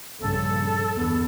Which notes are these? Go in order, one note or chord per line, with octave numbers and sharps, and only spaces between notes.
A#1 G2 C#3 A4
E2 D3 B3